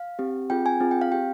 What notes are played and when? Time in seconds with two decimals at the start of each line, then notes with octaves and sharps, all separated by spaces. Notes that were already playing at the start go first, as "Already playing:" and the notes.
Already playing: F5
0.19 C4 G4
0.50 C4 F4 G#4 G5
0.66 G#5
0.80 C4 F4 G#4
0.91 G5
1.01 F5
1.12 C4 G4 G5